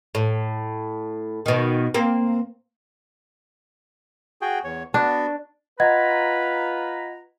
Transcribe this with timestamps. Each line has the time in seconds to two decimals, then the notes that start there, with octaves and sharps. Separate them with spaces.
0.15 A2
1.46 B2 D#3
1.94 A#3 C4
4.42 F#4 G#4 G5
4.64 E2 C#5
4.94 B3 D4 F#4
5.80 F4 B4 D#5 F#5 A#5 G#6